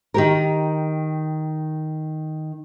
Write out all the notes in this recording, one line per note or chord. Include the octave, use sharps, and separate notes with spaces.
D#3 G4 A#4